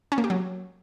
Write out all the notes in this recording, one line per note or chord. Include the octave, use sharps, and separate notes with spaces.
C#4
A#3
G4
F#3